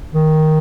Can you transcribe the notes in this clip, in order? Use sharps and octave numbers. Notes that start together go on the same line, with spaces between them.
D#3